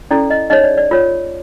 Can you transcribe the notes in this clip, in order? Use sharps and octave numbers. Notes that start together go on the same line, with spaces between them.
C#4 E4 A4 D5
D#5
D#4 G#4 C#5 D#5
D5
D5
F4 A#4 C#5